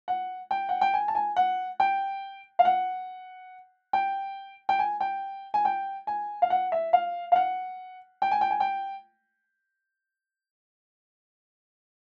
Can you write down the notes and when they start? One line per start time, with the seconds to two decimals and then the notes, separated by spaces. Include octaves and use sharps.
0.08 F#5
0.51 G5
0.69 F#5
0.81 G5
0.94 G#5
1.08 A5
1.15 G#5
1.37 F#5
1.80 G5
2.59 F5
2.65 F#5
3.93 G5
4.69 G5
4.79 G#5
5.01 G5
5.54 G#5
5.65 G5
6.07 G#5
6.42 F5
6.50 F#5
6.72 E5
6.93 F5
7.32 F5
7.36 F#5
8.22 G5
8.31 G#5
8.41 G5
8.51 G#5
8.60 G5